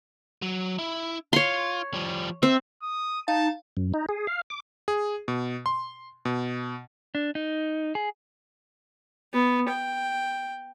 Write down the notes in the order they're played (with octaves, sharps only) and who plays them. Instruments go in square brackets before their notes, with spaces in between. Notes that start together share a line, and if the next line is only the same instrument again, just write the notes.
[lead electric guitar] F#3
E4
[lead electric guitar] F4 [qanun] C#5 C6
[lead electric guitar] F3 G3
[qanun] C4 [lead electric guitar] E5
[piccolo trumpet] D#6
[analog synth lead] D#4 [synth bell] F5 [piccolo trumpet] A5
[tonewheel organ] F#2
D#4
G#4
F5
D6
[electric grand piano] G#4
B2
C6
B2
[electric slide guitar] D4
D#4
G#4
[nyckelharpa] B3
G5